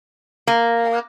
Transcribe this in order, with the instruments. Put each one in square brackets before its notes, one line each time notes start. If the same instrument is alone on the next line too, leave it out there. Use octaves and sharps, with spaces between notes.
[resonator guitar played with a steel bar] A#3